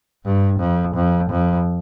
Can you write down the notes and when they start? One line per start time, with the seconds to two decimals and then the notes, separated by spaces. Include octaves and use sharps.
0.25 G2
0.60 F2
0.95 F2
1.30 F2